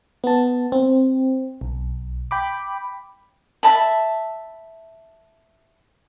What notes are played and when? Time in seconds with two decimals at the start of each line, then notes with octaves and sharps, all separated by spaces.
0.24 B3 A5
0.72 C4
1.61 B1
2.31 G5 B5 D6
3.63 E5 A5 B5